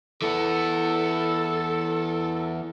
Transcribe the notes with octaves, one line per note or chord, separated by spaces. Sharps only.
E3 B3 A4